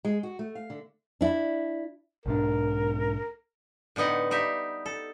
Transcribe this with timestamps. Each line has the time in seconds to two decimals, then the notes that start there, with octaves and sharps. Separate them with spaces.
0.05 G#3
0.23 F#4
0.39 A3
0.55 F5
0.70 D3
1.21 D4 E4
2.26 B1 G#2 D4 A#4
3.96 A2 D3 B3 D#4 F#5
4.31 G3 D#4 G4 E5
4.86 A4